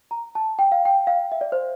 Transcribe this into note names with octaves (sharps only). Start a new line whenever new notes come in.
A#5
A5
G5
F5
G5
F5
E5
D5
C5